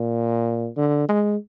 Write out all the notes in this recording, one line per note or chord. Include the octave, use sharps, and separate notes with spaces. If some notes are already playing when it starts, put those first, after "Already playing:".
Already playing: A#2
D3
G#3